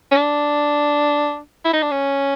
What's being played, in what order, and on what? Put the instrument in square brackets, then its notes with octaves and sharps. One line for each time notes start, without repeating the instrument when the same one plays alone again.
[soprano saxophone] C#4
D4
E4
D#4
D4
C#4